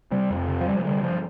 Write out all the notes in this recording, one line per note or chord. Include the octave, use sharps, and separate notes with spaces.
C3 G3
F2
C3
F3
C3 G3
F3
D3 G3
G2 F3